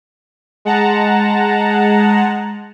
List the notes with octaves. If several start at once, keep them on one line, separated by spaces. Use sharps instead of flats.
G#3 F#5 A5 A#5